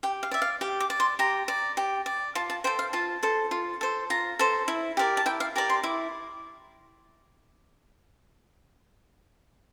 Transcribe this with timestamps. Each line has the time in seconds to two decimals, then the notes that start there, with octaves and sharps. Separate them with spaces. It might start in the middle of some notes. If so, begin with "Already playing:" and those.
0.03 G4 G5
0.23 F5
0.31 D5 E5
0.42 F5
0.61 G4 G5
0.80 D6
0.90 D5
1.00 C6
1.19 G4 A#5
1.48 D5
1.77 G4
2.06 D5
2.35 F4 A5
2.50 A5
2.64 A4 C5 G5
2.79 F5
2.93 F4 A5
3.23 A4 C5
3.51 F4
3.81 A4 C5
4.10 F4 A#5
4.39 A4 C5
4.68 E4
4.97 G4 A#4 D5
5.17 A5
5.26 E4 G5
5.40 F5
5.56 G4 A#4 D5 A5
5.70 C6
5.83 E4 D6